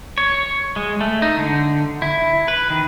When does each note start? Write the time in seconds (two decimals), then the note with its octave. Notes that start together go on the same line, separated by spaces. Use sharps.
0.18 C#5
0.76 G#3
1.01 A3
1.22 D#4
1.38 D3
2.02 E4
2.48 B4
2.70 D#3